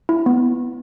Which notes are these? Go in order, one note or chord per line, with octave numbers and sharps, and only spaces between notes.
E4
B3